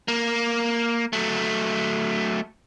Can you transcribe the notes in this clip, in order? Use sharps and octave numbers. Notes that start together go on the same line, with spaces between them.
A#3
F#3 A3